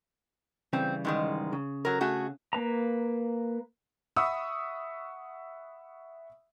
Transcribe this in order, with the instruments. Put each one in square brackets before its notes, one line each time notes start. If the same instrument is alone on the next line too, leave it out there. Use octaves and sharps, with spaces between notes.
[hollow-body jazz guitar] C#3 E3 G3 [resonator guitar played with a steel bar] C4
[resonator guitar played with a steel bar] G#2 D#3 G#3
[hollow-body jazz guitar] C#3
[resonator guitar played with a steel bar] F#3 A#4
A3 F#4 G#4
[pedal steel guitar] A#3 B4 A#5
[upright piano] E5 F#5 B5 C#6 D#6 E6